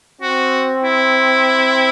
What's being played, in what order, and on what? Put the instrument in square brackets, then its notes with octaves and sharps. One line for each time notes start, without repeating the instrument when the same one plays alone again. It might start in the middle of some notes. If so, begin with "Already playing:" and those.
[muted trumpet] C4 [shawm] F#4
[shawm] E4